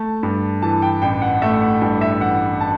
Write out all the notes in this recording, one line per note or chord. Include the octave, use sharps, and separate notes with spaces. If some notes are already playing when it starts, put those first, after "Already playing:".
Already playing: A3 A5
G2
E3 A5
G5
A1 G5
F#5
A3 E5
F#5
G2
E5
E3 F#5
A5